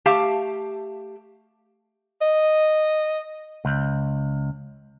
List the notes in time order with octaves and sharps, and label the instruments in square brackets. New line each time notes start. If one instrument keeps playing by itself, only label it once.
[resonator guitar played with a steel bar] A3 G4 F5 A5
[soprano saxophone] D#5
[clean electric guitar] C#2